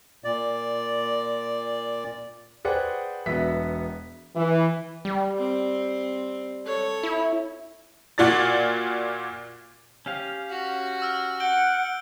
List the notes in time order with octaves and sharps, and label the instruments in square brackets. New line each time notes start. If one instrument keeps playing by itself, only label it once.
[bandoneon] A#2 D5
[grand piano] G#4 B4 C5 D5 F#5 G5
E1 B3 F#4 E5 B6
[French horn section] E3
[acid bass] G3
[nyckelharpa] C4
A4 C#5
[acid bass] E4
[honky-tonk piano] A#2 F4 F#4 D5 A6
[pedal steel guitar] C#4 G4 F5
[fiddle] F#4
[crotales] E6 F6
[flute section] F#5 [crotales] G6 D7 G7